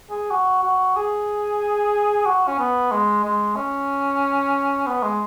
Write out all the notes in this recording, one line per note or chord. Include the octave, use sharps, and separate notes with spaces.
G#4
F#4
F#4
G#4
F#4
C#4
B3
G#3
G#3
C#4
B3
G#3